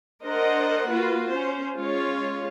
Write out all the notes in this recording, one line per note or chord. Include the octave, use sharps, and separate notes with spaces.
D4 A#4 C5 D#5 F#5
A#3 F4 F#4 B4
C#4 C5
G#3 C#4 F4 C#5